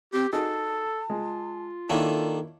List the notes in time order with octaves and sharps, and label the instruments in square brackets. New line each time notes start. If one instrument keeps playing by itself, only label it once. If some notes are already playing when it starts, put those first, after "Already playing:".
[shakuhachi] C4 [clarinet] G4
[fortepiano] D#4 F#4 G#4 [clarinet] A4 [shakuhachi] A5
[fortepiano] G#3 [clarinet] F4
[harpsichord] D#3 A#3 D4 [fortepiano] E4 C#5 [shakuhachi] A4